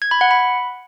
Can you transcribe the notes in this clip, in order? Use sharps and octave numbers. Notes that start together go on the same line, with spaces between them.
G#6
B5
F#5
B5